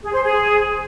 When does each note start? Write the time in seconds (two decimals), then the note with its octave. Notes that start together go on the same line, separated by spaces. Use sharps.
0.03 G#4
0.13 C5
0.24 G#4